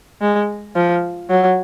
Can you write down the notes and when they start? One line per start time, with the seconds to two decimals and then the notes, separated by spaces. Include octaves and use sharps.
0.21 G#3
0.75 F3
1.30 F#3